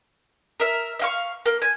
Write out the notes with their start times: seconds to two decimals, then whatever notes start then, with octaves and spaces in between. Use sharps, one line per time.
0.60 A#4 E5
0.99 E5 F5 C#6
1.46 A#3
1.62 G#5